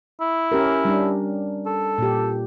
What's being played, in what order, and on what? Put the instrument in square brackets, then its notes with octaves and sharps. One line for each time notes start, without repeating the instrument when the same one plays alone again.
[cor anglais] E4
[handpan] C#4 G4 A#4
G3 D4
[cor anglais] A4
[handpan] A#2 G4